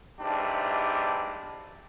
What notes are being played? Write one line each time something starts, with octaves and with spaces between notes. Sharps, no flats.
B1 G#2 D4 E4 G4